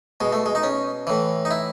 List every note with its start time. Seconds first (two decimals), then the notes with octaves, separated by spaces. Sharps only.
0.21 B2 G#3
0.32 A3
0.46 G#3
0.55 D#4
0.63 C#4
1.07 A2 E3
1.45 D#4
1.51 E4